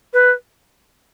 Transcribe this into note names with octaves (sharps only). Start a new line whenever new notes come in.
B4